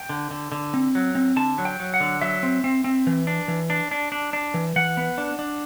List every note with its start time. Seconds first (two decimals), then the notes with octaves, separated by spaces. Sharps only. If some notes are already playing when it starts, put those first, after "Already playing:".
Already playing: G5
0.09 D3
0.31 D3
0.52 D3
0.74 C4
0.95 F#3
1.15 C4
1.36 D3 A5
1.58 F#3
1.65 G5
1.80 F#3
1.94 F#5
2.00 D3
2.21 F#3 E5
2.43 C4
2.64 C4
2.84 C4
3.07 E3
3.27 D4
3.48 E3
3.70 D4
3.91 D4
4.12 D4
4.33 D4
4.54 E3
4.76 E3 F#5
4.97 B3
5.18 D4
5.39 D4